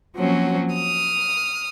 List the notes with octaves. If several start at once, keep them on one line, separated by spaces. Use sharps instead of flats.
F3 F#3 A#3 C4 C#4 F#4
D#6 F6